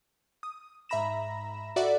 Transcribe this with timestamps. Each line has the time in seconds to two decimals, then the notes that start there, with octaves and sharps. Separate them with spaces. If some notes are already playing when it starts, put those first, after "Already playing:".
0.43 D#6
0.89 G#2 E5 A#5 B5 A#6 E7
1.76 F#4 A4 D5 E5 F#5